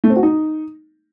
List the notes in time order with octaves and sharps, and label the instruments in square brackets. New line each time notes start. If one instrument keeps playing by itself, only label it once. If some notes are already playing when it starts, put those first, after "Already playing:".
[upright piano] A3
C4
F#4
D#4